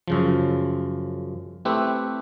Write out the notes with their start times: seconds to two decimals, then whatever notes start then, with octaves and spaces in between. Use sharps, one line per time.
0.08 F#2 C#3 F3
1.65 A3 C4 E4 G4 B4